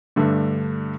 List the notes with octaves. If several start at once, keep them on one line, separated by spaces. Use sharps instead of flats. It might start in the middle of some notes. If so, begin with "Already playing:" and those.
G2 D3 A3